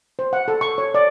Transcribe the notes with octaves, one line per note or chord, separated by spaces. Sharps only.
C5
F#5
A4
C#6
C#5
D5